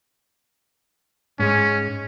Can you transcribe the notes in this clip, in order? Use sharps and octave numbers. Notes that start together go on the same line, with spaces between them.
G#2 G#3 C#4